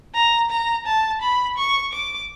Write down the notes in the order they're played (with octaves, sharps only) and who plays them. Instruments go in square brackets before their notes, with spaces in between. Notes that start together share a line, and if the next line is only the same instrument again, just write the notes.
[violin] A#5
A#5
A5
B5
C#6
D6